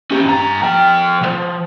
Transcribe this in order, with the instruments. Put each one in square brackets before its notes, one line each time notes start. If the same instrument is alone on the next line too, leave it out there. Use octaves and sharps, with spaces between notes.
[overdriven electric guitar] C#4 G4
G2 A#5
F3 G5
B1 F3